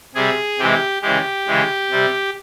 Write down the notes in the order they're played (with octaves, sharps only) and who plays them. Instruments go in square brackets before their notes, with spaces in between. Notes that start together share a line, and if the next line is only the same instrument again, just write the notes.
[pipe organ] C3 G3 G#4
C3 E3 G#3 G4
C#3 E3 G#3 G4
C#3 E3 G#3
C3 G3